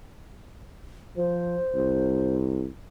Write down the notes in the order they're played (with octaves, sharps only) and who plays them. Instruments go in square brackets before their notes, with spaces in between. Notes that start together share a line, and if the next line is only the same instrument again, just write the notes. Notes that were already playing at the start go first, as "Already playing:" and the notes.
[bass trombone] F3 [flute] C5
[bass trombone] C2